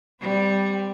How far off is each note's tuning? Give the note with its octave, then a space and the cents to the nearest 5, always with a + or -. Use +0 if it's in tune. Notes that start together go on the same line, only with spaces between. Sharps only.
G3 +5 C4 -30